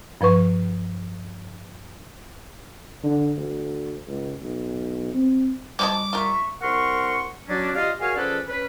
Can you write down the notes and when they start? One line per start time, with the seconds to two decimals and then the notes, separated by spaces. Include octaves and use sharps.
0.21 G2 F3 B4 C#6
3.03 D3
3.37 D2
4.07 C#2
4.42 B1
5.14 C4
5.79 F3 G3 G#3 D4 D6
6.13 F4 A#4 E5 C#6
6.61 C2 A#4 F#5 C6 C#6
7.48 F#3 C#4 D4
7.75 F4 G4 D5 D#5 F5
8.00 F#4 G#4 A#4 C#5 F5 G#5
8.16 F3 C#4 G#4 A4 B4 D5
8.47 C#4 B4